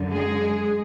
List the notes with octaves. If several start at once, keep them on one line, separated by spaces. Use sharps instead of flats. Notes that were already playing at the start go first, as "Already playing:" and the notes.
Already playing: F#2 D3
G#3 G#4